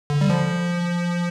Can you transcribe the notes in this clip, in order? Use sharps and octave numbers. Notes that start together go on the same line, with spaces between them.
D3
G3
F3